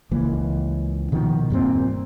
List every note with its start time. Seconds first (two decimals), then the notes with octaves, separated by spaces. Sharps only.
0.11 C#2 E3 A#3
1.12 B2 D#3 F3
1.50 E1 G2 A#2 C4